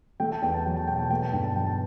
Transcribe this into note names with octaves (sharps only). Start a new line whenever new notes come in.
A3 G5
A5
E2 G5
A5
F#3 G5
A5
B2 G5
A5
A3 G5
A5
G1 G5
A5
F#3 G5
A5